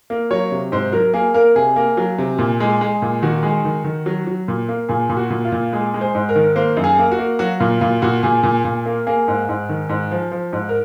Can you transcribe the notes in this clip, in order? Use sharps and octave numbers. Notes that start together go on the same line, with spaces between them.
A#3
F#3 C#5
C3
G#2 C5
F#3 A#4
A#3 G#4
A#3 A#4
C3 G#4
A#3
F#3
C3
A#2
G#3
G#3
A#2
D#3 F#4
G#3
D#3
D#3
F#3
F#3
A#2
A#3
A#2 G#4
A#2
F#4
A#2
F4
A#2
G#3
G#3
C5
G#2
A#4
D#3
A#3 C5
F#2
G#4
A#3
F#4
A#3
F#3 F#4
A#2 F4
A#2 F4
A#2 F#4
A#2 G#4
A#2
A#2
A#3
A#3 G#4
G#2
G#2
D#3
G#2
F3
F3
G#2
A#4